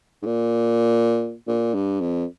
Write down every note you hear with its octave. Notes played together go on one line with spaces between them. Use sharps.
G#2
A#2
A#2
G2
F2